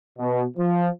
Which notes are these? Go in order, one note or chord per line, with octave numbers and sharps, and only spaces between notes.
B2
F3